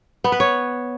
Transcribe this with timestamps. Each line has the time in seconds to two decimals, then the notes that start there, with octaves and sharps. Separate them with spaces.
0.24 B3
0.32 B4
0.40 C#5